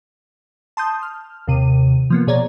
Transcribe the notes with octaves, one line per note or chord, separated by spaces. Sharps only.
A5 C6 D#6 G6
F6
D#2 C3 D#7
F3 A#3 B3
B2 G#4 C#5 D5 A#5 G#6